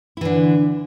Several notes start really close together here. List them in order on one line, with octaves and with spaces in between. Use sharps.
E4 E3 D3